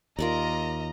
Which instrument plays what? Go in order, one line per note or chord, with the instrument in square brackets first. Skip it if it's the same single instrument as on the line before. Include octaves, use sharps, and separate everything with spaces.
[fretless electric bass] D#2 [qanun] F4 A#4 D5 [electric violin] D#5 A#5